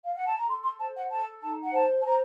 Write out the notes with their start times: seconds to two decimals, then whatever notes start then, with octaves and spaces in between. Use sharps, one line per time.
0.04 F5
0.15 F#5
0.26 A5
0.36 A#5
0.47 A4 C6
0.63 C6
0.78 C5 A5
0.94 F#5
1.10 A4 A5
1.42 D#4 A5
1.62 F#5
1.72 C5 A5
2.00 A5
2.04 C5 A#5